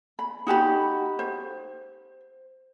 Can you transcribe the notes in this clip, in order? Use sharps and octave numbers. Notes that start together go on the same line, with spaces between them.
B5
D#4 F#4 G4 B5
C5